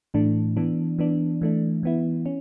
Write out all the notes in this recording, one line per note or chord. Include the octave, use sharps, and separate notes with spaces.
A2 E3 A3 D4
E3 B3 D4
E3 B3 D4
E3 A3 D4
E3 B3 E4
C#4